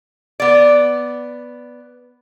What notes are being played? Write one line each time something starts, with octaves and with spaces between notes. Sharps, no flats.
B3 D5